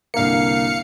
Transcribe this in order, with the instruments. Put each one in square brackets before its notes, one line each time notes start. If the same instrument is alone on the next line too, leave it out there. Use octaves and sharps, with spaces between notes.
[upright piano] C2 D3 A#3 [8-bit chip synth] F5 C#7